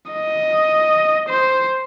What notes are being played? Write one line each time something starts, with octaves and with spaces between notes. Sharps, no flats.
D#5
C5